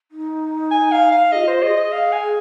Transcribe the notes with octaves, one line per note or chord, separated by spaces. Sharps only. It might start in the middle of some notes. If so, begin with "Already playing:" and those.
D#4
G#5
F5
F5
F4 G#4 D#5
C5
G#4 D#5
D#5
F5
G#5